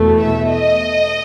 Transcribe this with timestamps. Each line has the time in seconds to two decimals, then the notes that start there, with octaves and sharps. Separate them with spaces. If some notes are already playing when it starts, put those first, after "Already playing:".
Already playing: E2 B2 A3
0.19 E5
0.50 D#5